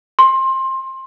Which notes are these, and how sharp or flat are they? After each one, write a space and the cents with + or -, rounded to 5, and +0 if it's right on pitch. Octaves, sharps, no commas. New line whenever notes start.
C6 +20